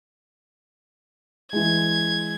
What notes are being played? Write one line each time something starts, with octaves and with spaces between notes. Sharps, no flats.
E3 G#3 G#6